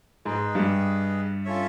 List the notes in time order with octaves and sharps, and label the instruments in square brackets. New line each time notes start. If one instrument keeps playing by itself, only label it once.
[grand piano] G#2 G#3 [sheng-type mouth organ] G#4 B4 D#5
[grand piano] G2 G3
[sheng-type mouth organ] C#4 F4 A4 C#5 E5